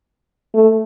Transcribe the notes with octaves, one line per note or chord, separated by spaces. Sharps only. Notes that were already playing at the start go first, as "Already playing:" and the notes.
A3